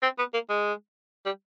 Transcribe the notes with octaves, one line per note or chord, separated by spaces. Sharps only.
C4
B3
A#3
G#3
G3